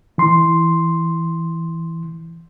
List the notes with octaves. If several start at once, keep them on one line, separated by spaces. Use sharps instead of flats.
E3 C6